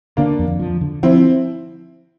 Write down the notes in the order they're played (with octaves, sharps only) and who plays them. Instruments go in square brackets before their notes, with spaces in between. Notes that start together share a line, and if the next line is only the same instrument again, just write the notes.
[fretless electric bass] D3 [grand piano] A#3 D4
[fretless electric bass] F2
F3
D3
[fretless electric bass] F3 [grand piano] C4 E4